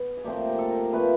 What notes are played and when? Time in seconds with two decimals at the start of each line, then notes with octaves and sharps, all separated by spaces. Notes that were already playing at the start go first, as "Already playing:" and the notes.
Already playing: B3
0.17 G#4
0.24 A#2 F3 A3 C4 G4
0.47 A#4
0.58 A4
0.70 A#4
0.93 A#2 F3 A3 C4 B4